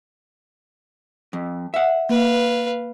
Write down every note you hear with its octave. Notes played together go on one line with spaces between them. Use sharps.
F2
E5 F#5
A#3 B4 F5